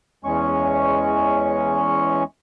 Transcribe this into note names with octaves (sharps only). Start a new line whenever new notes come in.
E2 G#3 C#4 C#6